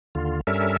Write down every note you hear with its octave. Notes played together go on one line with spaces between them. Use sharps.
D#2 D3 F4
G2 G3 C#4 A4 A#4 E5